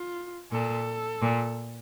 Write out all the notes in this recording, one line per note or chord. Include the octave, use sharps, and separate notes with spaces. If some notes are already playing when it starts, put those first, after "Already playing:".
Already playing: F4
A#2 A4
A#2